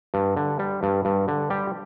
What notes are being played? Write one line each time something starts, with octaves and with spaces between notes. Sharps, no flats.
G2
D3
G3
G2
G2
D3
G3 G4